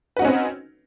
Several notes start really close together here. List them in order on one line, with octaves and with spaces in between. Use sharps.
B4 F#4 D#4 C#4 C4